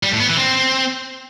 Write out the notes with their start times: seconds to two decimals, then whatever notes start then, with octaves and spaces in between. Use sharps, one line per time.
0.03 G3
0.12 A2
0.20 B3
0.29 E3
0.38 C4